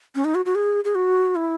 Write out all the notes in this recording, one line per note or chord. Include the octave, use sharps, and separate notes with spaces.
C#4
D#4
F#4
F#4
G#4
G#4
F#4
E4